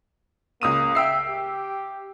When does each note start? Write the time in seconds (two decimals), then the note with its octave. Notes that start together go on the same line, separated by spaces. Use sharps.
0.61 C#2 A#3 D#6 D#7
0.95 E5 G5 E6 C7
1.30 G4